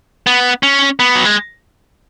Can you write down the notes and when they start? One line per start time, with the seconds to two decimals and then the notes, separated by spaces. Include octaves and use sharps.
0.27 B3
0.63 C#4
1.00 B3
1.15 F#3
1.25 G#3